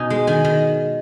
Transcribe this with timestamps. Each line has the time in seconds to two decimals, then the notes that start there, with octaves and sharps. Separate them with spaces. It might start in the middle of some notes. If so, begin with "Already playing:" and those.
Already playing: B2 C#4 D#4 G#5
0.10 G#3
0.27 D#3 G#5
0.45 D#3